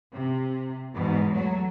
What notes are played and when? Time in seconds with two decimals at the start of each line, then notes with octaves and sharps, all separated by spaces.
0.12 C3
0.95 E2 G#2 B2
1.33 F#3 A3